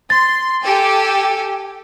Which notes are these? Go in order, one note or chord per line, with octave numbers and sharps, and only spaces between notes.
C6 A6
G4 A4 G5 G#5